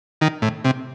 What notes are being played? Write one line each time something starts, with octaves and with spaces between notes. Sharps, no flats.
D#3
A2
C3